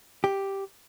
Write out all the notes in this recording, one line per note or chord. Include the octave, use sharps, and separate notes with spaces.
G4